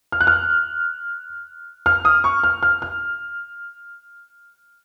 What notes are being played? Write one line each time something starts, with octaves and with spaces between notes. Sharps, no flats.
F6
F#6
F6
F6
D#6
C#6
F6
F6
F6